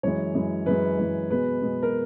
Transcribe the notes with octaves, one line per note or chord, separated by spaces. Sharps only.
F#2 E3 G#3 C#5
F#2 E3 G#3
F#2 E3 G#3 B4
F#2 E3 G#3
B2 G#3 B3 B4
B2 G#3 B3
A#4